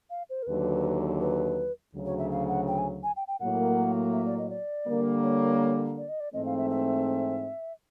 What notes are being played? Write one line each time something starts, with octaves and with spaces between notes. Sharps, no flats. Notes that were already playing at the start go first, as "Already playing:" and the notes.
F5
C5
A#4
D#2 D3 F#3 B4
B4
D2 C#3 F#3
C#5
E5
F5
F#5
G5
G#5
G#5
G5
G5
A2 F#3 A#3 F#5
E5
D5
D#5
D5
D3 G3 A#3
C#5
D5
D#5
D5
G#2 E3 A3 C4 D#5
F5
E5
E5